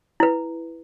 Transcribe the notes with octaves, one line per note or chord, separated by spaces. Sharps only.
E4 B4